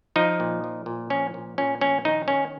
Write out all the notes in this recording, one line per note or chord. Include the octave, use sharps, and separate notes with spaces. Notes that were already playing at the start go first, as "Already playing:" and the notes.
F3 D#4
A#2
F3
A#2
F3 C#4
A#2
A#2 C#4
A#1 C#4
D#3 D#4
D#3 C#4